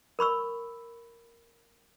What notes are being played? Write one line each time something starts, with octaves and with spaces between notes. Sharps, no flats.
A#4 B5 C#6 E6